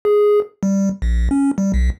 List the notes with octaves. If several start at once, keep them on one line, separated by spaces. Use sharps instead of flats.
G#4
G3
A#1
C#4
G3
B1